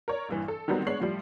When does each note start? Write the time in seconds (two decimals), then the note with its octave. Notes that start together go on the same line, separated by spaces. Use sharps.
0.08 A#4 C#5 D5
0.29 A#1 G2 E3
0.48 A4
0.68 D#3 F#3 G3 B3 C4 D#4
0.86 G#3 B3 D4 C#5 C7 F#7
1.00 A2 F3 G3